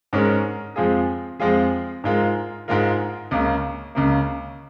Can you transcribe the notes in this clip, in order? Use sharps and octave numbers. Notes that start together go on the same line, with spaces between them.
G#2 G#3 C#4 A#4
F2 F3 G#3 F4 G#4
F2 F3 G#3 F4 G#4
G#2 G#3 F4 A#4
G#2 G#3 F4 A#4
C#2 C#3 A#3
C#2 C#3 A#3